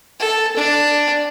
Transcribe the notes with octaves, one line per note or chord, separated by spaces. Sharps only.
A4
D4